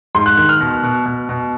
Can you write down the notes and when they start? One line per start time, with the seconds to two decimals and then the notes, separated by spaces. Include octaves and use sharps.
0.15 G#2 C6
0.26 F#6
0.37 D#3 F#6
0.49 F6
0.60 B2
0.83 B2
1.06 B2
1.29 B2